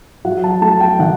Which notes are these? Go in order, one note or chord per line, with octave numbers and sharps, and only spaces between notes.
F#3 F#5
A5
A3 A5
G5
D#3 F#5